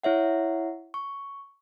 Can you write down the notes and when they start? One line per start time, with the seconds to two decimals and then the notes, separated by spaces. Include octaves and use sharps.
0.03 E4 C#5 E5 F#5
0.94 C#6